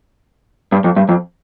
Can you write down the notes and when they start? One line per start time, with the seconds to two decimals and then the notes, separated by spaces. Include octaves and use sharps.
0.72 G2
0.84 F2
0.96 G2
1.09 F2